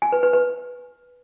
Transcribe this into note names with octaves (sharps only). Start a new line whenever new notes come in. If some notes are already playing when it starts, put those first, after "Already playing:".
G#5
B4
B4
B4